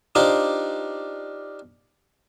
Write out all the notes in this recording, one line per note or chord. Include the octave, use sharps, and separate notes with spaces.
D4 D#4 F4 G4 C5